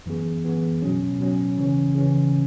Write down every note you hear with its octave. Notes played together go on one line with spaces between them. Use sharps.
F#2 E3 B3 G#4
F#2 E3 B3 G#4
B2 F#3 C#4
B2 F#3 C#4
C#3 E3 C#4
C#3 E3 C#4